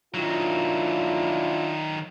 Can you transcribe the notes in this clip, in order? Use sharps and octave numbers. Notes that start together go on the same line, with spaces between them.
D#3 F#3 D4 E4 F4